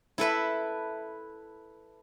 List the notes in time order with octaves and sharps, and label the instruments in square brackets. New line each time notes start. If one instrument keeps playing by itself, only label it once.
[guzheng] E4 A4 B4 E5